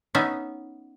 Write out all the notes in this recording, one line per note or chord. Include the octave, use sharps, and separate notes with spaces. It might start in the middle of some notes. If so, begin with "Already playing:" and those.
B3 C#4 D#4 E5